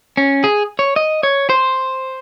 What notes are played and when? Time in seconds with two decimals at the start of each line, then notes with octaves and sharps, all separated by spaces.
0.17 C#4
0.44 G#4
0.79 C#5
0.96 D#5
1.23 C#5
1.49 C5